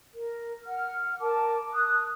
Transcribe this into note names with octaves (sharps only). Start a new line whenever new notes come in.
A#4
F#5 F6
A#4 A5 D6
D#6 F#6